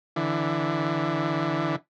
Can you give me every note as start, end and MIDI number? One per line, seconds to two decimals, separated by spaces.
0.16 1.76 50
0.16 1.76 52